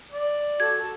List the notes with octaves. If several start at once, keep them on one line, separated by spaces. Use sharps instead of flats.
D5
F#4 A4 G#6